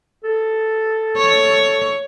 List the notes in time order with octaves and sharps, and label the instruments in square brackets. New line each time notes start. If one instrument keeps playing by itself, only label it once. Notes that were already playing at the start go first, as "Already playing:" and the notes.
[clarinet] A4
[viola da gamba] C#5